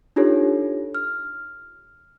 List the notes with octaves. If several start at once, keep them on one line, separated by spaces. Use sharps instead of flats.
D4 D#4 F4 G4 A4 C#5
F6